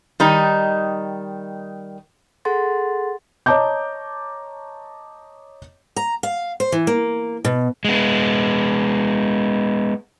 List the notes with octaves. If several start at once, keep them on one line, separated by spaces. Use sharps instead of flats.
D#3 G3 D#4
G#4 A4 F#5 C6 A6
C#5 D#5 A5 A#5 D6 G6
A#5
F5
C5
E3
A#3
B2
G#3 B3